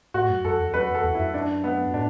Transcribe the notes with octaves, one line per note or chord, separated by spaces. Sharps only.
A2 F#4
F#2
F#2 A4
E2
F#2 B4
E2
A4
E2
F#2 E4
D4
B3
A2 D4